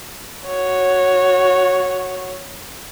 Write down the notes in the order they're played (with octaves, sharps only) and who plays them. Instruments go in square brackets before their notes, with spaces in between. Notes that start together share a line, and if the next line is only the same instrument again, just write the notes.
[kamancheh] F#4 C#5